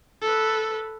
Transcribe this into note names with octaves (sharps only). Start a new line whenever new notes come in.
A4 B4